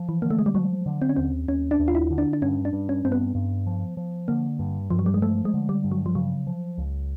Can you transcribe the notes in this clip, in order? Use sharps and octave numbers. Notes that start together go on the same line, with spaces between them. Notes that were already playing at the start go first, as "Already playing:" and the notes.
Already playing: F3
E3
D3 A#3
A3
G#3
G3
F3 F#3
D3
C4
C#4
D#2 C4
D#2 C#4
D4
D#2
F4
E4
D3
D4
D4
G2 C#4
D4
G2
C#4
G2 C4
B3
G2
F3
F3
D3 A#3
G2
G2 F3
F#3
G3
G#3
F3 A3
G#3
D3
G3
G2
F#3
F3
C#3 F#3
F3
C#2